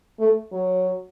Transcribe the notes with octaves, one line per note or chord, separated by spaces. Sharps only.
A3
F#3